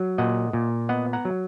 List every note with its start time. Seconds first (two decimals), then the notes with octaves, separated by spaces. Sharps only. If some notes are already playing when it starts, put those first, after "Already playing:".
Already playing: F#3
0.18 A#2 D#5 F#5
0.53 A#2
0.89 B3 D#5 F#5
1.13 F#5 A#5
1.25 F#3